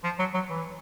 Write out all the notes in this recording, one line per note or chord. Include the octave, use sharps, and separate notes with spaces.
F3
F#3
F#3
E3